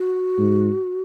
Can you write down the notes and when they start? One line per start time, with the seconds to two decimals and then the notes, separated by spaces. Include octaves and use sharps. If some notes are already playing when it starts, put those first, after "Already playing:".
Already playing: F#4
0.38 G#2